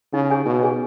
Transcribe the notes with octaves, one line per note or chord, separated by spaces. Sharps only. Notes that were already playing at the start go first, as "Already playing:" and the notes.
C#3 D#4
G#4 C#5 G#5
B2 D#4
G#4 C#5 G#5